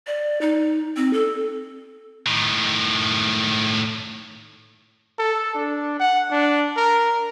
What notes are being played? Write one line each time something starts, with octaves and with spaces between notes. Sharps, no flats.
D5
D#4
C4
A4
A2 D#3
A4
D4
F#5
D4
A#4